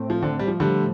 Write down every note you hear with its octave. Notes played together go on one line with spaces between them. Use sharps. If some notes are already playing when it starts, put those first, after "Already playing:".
Already playing: A2 A3 C4
F3
D3
G3
F3
A2 D3 F3 G3 A3